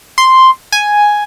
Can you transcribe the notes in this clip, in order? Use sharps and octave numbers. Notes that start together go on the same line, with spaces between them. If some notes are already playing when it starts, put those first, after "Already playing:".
C6
G#5